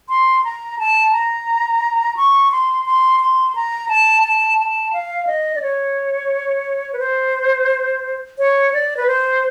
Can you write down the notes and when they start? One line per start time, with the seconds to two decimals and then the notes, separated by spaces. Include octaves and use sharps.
0.09 C6
0.44 A#5
0.79 A5
1.13 A#5
2.17 C#6
2.52 C6
2.86 C6
3.20 C6
3.55 A#5
3.89 A5
4.24 A5
4.59 A5
4.93 F5
5.27 D#5
5.56 D5
5.62 C#5
6.93 B4
7.00 C5
8.39 C#5
8.73 D5
8.97 B4
9.07 C5